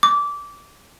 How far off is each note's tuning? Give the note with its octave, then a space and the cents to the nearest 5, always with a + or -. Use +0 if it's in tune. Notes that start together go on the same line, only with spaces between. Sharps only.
D6 -20